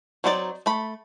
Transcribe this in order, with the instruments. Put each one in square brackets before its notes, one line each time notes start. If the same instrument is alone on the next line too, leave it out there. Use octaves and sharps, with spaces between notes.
[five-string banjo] F#3 C4 D#4 F#4 D5
A3 B5